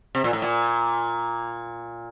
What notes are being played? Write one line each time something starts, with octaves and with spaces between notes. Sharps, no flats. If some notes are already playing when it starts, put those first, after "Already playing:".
C3
A#2
A2
A#2